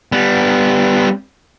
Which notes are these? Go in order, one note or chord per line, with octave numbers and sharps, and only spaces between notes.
G3 B3